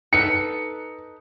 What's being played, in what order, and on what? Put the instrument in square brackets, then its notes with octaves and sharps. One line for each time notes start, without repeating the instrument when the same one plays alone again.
[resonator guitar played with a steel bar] D#4 A4 B4 [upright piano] C#7